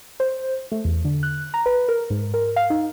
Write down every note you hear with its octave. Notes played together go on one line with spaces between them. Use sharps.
C5
A3
E2
D3
F#6
A#5
B4
A#4
G#2
A#4
F5
D#4